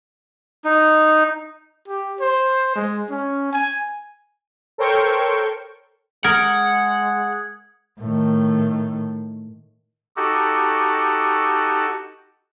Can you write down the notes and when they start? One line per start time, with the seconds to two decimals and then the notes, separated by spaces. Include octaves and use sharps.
0.65 D#4
1.88 G4
2.20 C5
2.76 G#3
3.10 C#4
3.52 G#5
4.78 A4 A#4 C5 C#5 G5 C#6
6.24 G#3 A#4 F#5 D#6 G#6
8.00 A2 D#3
10.17 D#4 F#4 G4 A4